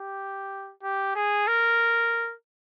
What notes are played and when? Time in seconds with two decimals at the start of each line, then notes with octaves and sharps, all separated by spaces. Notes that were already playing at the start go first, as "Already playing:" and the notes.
Already playing: G4
0.83 G4
1.15 G#4
1.47 A#4